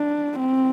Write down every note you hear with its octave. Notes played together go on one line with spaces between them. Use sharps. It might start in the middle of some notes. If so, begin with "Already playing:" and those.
Already playing: D4
C4